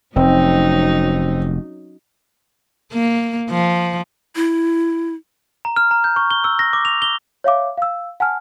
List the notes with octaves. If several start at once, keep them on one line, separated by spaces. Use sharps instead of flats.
F1 F#3 C4 C#4 D#4
A#3
F3
E4
A#5
F6
A#5
G6
C#6
G7
E6
A#6
D6
F7
G7
C#5 E5 F5 D6
F5 E6
F#5 G#5 A5 F6